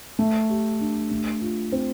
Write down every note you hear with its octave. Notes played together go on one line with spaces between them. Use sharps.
A3
G4
D4
A3
F4
C4